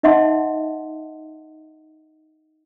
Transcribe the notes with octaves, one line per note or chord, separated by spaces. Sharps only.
D#4 D#5 E5 F#5 A5 C6